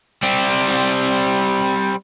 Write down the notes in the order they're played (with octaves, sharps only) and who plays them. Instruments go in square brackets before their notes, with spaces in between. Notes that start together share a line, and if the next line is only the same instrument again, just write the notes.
[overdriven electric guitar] G3 C4